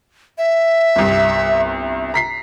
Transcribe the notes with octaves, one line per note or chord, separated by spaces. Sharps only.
E5
G1 C2
A#5 B6 C7